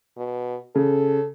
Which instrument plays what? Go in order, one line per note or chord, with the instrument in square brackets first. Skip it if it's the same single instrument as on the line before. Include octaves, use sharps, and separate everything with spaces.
[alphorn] B2
[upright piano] C#3 [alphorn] A4